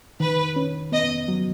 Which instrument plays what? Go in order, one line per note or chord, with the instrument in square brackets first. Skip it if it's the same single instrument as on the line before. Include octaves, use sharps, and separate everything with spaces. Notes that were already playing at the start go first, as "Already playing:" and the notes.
[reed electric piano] D#3 [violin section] B4
[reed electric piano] C#4
[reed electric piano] B3 [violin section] D#5
[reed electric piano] F#3